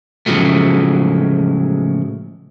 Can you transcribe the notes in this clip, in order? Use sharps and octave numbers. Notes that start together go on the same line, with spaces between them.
A2 C#3 F3 F#3 G#3 A3